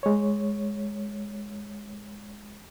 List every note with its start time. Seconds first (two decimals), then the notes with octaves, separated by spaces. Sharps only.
0.03 G#3 C#5